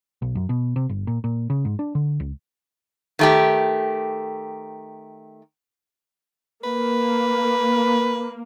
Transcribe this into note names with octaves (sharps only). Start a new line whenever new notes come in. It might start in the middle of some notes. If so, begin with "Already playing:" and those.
B1
F#2
B2
C3
G1
A#2
A#2
C#3
G#2
D4
D3
C#2
D#3 A3 G4
A#3 B4